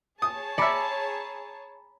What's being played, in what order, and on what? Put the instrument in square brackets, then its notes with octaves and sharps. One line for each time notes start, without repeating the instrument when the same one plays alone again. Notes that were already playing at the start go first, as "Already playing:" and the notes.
[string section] G#4 C#5 A5 [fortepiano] D#6
[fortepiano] D5 E5 [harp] A#5 B5 C#7